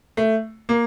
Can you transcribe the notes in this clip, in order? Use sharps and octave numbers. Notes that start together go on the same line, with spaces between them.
A3
A#3